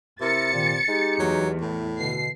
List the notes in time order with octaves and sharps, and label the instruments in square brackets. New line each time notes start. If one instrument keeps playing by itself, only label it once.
[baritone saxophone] C3 [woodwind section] E4 A#4 [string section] A6 C#7
[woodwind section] A#2 D#3
G#3 D#4 G4
[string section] E2 [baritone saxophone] F#3
[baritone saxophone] A2
[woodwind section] B2 D3 [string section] C7